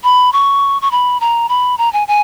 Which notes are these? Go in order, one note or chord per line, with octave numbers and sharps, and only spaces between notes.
B5
C#6
C#6
B5
A#5
B5
A#5
G#5
G#5